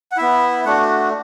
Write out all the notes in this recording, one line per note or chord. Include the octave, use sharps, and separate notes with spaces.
F#5
B3 E4 E5
A3 D4 F#4 F#5